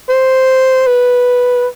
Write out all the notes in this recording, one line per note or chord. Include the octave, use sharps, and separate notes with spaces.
C5
B4